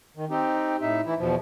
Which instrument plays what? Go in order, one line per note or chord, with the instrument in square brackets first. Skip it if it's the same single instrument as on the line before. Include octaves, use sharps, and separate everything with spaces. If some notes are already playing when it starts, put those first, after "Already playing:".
[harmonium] D#3
C4 D#4 G4
A2 D#4 E5
E3 E4
E2 B2 F3